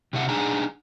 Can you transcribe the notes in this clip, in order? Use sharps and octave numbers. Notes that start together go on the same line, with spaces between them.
C3 E4 F#5
D4 D#4 G#4 F#5 G#5 A#5